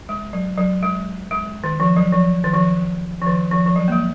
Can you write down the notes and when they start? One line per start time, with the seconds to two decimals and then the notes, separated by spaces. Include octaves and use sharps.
0.09 G#3
0.33 F#3
0.58 F#3
0.82 G#3
1.31 G#3
1.64 D#3
1.80 F3
1.97 F#3
2.13 F3
2.44 D#3
2.54 F3
3.22 F3
3.27 D#3
3.51 F3
3.66 F3
3.76 F#3
3.88 A#3
3.92 G#3